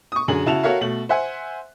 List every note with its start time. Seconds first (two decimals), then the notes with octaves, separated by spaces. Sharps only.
0.12 C#6 D#6
0.28 F#2 D3 G#4 F#7
0.46 C#3 E4 F#4 A5 E7 F7
0.63 F#4 A4 A#4 C#5 E5 F5
0.81 B2 A3 F#7
1.09 C5 E5 F#5 G#5